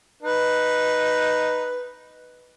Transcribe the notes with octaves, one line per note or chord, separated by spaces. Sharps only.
D#4 B4